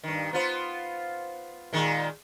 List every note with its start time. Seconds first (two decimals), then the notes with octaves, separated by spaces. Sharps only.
0.04 G2 D#3
0.33 B3 F4 C5
1.73 A#2 D#3 G#3